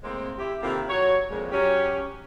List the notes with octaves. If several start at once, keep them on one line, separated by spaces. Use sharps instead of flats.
A2 G#3 A#3 C4
E4 G4
C3 D#3 A#3 E4 F4 A4
F#3 C#5
F2 A#2 G#3
F#3 C#4 G4